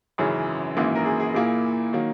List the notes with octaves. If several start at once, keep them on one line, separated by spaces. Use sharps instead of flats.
G#1 F#2 C#3 E3 G#4
G#1 F#2 E3 A#3
A#4
G#4
G#4
A#2 A#3 E4 G#4
D#3 F#3 A#3